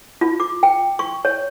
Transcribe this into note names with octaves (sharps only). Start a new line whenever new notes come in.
F4
D6
G5
C#6
C#5